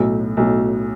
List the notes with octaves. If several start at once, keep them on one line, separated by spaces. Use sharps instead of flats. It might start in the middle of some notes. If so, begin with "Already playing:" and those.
Already playing: B1 A2 F#3
B1 A2 F#3